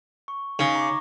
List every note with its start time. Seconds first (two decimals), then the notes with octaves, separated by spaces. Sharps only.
0.28 C#6
0.59 C#3 D#4 C#6 A#6
0.75 A#5 C#6 D6